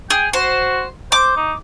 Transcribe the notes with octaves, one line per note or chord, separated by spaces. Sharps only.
G#4 G5
F#4 C5
C5 D6
D#4